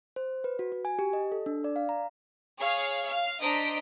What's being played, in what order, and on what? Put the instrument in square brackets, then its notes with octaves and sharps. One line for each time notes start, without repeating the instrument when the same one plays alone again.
[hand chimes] C5
B4
F#4
F#4
G#5
G4
D#5
A4
D4
D5
F5
A#5
[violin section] G#4 C#5 F5
F5
D4 C5 D#5 A#5 B6 D7